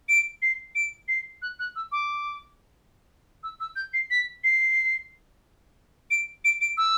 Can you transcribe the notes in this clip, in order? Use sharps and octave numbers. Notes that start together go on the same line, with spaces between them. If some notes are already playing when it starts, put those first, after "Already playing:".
D7
C7
D7
C7
F#6
F#6
E6
D6
E6
E6
G6
C7
B6
C7
D7
D7
D7
E6